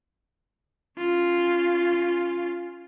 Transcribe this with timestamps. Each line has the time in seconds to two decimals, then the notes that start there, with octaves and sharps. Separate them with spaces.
0.98 C#4 F4